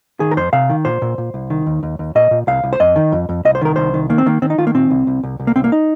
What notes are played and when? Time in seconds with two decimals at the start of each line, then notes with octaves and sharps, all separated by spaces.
0.20 D#3 G#4
0.31 A#4
0.37 F2 C5
0.53 C3 F5
0.70 D#3
0.85 A#2 C5
1.02 A#2
1.18 A#2
1.34 C2
1.50 D#3
1.66 D#2
1.83 D#2
1.99 D#2
2.15 A#2 D#5
2.31 A#2
2.47 C2 F5
2.64 C2
2.73 C5
2.80 F2 D#5
2.96 D#3
3.12 F2
3.29 F2
3.45 C2 D#5
3.55 C5
3.61 D#3 A#4
3.76 C2 C5
3.94 D#3
4.10 D#3 A#3
4.18 C4
4.26 D#3 A#3
4.42 D#3 C4
4.50 D#4
4.58 D#3 F4
4.67 A#3
4.74 A#2 C4
4.90 C2
5.07 C2
5.23 C2
5.40 C2
5.47 A#3
5.56 C2 C4
5.64 A#3
5.72 D#4